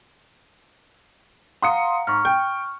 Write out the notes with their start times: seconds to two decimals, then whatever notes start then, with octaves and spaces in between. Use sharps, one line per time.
1.62 F5 F#5 A#5 C6 D#6 C#7
2.07 G#2 C#6 F6
2.25 G5